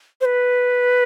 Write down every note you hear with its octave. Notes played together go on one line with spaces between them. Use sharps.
C5
B4